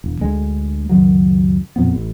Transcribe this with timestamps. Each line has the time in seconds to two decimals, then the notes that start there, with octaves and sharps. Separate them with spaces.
0.04 E1
0.21 D2 D3 G#3
0.89 C#2 F#2 D#3 F#3
1.76 F2 A#2 F3 B3
1.93 A1